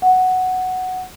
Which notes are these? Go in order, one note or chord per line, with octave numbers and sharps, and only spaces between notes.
F#5